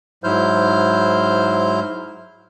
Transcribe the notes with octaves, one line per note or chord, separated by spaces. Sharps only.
G#2 F#3 E4 C5 F6 G6